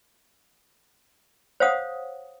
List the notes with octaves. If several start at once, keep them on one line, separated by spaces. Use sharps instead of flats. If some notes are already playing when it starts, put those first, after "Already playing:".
C5 C#5 F5 F#5 D#6